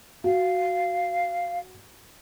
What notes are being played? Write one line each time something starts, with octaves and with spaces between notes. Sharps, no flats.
F#4 F5